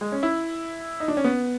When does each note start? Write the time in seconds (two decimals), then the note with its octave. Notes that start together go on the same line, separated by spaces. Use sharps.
0.01 G#3
0.12 C#4
0.23 E4
1.00 D#4
1.08 D4
1.17 C#4
1.24 B3